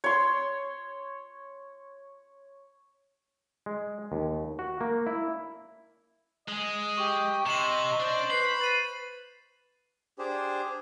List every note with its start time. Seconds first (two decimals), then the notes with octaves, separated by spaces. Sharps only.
0.04 C#5 C6
3.66 G#3
4.12 D#2
4.59 F#4
4.81 A#3
5.07 E4
6.48 G#3 G#4 D#5
6.98 G4 C#6
7.46 C3 C4 D#5 E7 F#7
8.00 D4 C5
8.30 B4 B5 C7
8.61 A6 D#7
10.19 D4 G4 G#4 C5